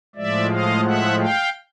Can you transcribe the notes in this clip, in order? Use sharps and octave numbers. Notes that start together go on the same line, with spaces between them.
A2 F3 G#3 D5 E5
D#5 F5
E5 F#5
F5 G5